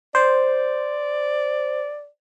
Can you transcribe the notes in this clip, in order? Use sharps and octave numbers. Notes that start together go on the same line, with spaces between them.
C5 D5